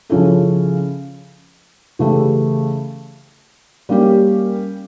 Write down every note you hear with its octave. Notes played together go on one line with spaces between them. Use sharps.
C#3 F3 C#4 E4 A4
C#3 E3 A3 E4 G4
G3 A#3 C#4 G4